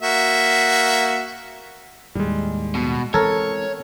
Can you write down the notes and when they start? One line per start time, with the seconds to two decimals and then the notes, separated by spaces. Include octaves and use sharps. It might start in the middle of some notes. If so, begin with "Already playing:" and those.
0.02 A#3 F#4 E5
2.15 D#2 A2 G3 G#3
2.75 B2
3.14 E3 G#3 C4 A4 A#4 C#5 G#6